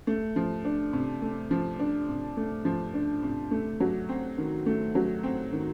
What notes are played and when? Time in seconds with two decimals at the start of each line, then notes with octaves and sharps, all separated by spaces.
0.07 A3
0.36 F3
0.65 D4
0.93 C3
1.22 A3
1.51 F3
1.79 D4
2.09 C3
2.37 A3
2.65 F3
2.94 D4
3.23 C3
3.51 A3
3.80 F#3
4.09 C4
4.38 D#3
4.66 A3
4.95 F#3
5.23 C4
5.52 D#3